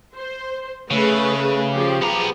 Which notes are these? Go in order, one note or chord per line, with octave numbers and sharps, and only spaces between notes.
C5
C#3 A3 G#4 B4
F3 G4 G#4
B3 A#5